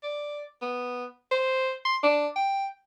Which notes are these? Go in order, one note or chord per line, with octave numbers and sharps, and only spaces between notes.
D5
B3
C5
C6
D4
G5